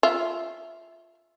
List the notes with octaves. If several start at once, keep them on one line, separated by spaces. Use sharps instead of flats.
F4 E5